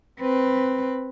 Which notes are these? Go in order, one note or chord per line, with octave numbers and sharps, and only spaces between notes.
C4 B4